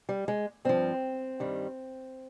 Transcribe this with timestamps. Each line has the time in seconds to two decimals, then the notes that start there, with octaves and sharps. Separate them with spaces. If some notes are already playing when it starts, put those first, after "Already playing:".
0.09 G3
0.28 G#3
0.65 G2 F3 C4
1.40 G2 D#3 G3